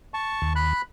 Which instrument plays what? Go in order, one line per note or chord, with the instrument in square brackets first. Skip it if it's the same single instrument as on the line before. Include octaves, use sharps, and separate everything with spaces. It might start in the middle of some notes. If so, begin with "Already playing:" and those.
[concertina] A5 C#6
[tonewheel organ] D#2
[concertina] B5 F#6